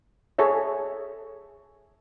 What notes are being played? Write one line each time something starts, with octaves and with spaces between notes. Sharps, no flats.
G#4 A4 C#5 E5